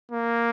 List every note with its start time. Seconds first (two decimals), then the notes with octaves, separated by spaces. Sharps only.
0.11 A#3